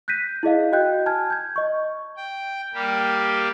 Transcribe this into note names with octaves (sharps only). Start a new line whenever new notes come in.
F#6 G6 A#6 B6 D#7
E4 G#4 D#5 F5
F#4 D#5 G5 F#6 G6
G#5 A5 F6 G#6
G6 G#6
D#5 C#6
G5
G3 A#3 G4